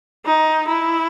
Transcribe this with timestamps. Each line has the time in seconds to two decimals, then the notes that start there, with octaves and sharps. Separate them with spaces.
0.26 D#4
0.67 E4